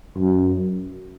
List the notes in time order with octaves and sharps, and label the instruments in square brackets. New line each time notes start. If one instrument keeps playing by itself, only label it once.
[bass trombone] F#2